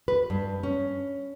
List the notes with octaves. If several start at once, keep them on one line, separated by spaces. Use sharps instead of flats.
B4
G2
C#4